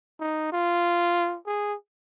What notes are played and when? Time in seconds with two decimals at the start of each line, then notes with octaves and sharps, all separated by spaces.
0.20 D#4
0.52 F4
1.47 G#4